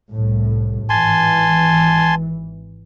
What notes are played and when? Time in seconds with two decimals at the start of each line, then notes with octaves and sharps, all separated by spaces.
0.10 C2 A2
0.90 G#1 E3 G#5 A5 C6